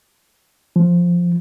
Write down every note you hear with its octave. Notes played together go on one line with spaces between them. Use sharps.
F3